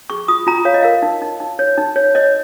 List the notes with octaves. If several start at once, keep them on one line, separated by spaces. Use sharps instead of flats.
G#4 C#6
F4 D#6
F4 A#5
C#5 F5
D#5
A#4 F5
D#4
D#4
D#4
C#5
D#4
C#5
C#5 D#5